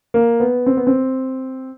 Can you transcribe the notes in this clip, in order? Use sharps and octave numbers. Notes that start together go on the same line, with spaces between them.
A#3
B3
C4
B3
C4